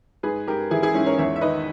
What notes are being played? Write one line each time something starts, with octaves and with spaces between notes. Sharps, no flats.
G#2 G#4 B4
G#2 G4 A#4
E3 E4 G#4
E4 G#4
G#2 C#4 E4
A#4 C#5
E2 C#5 E5
E5
D#3 B4 D#5